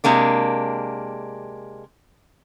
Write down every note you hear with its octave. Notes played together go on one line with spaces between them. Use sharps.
C3 G#3 A#3 D4